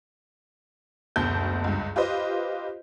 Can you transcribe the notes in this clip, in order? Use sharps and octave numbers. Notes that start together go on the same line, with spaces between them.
F#1 D2 B2 A5 G6
C#2 G2
F4 G4 B4 C5 D#5